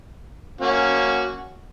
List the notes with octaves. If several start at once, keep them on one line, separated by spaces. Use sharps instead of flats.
A#3 C#4 F#4